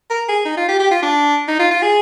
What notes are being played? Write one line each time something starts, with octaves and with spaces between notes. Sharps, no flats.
A#4
G#4
D#4
F4
G4
G4
F4
D4
D#4
F4
F4
G#4